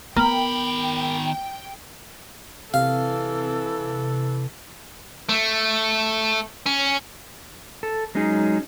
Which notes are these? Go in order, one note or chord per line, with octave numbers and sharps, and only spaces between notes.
D#3 B3 A#4 G5 B5
C3 E3 A4 F5
A3
C#4
A4
F#3 G#3 C#4 D#4 G#4